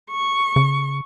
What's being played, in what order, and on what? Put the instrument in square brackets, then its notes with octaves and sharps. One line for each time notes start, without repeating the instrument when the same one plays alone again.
[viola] C#6
[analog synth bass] C#3